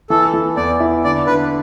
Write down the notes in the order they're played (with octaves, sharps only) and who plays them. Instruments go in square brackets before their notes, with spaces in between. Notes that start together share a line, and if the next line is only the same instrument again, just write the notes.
[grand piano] E3 [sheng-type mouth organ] A4
[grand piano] E3
[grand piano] E2 [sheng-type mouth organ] D5
[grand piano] E4
[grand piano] D3 [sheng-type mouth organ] D5
[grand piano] D3 [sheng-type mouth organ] B4